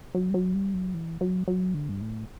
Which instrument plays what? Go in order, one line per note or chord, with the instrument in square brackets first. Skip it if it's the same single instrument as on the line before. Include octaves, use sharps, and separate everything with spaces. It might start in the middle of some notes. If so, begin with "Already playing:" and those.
[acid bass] F#3
G3
F#3
G3
F#3
E3
F#3
F#3
D3
G2
A2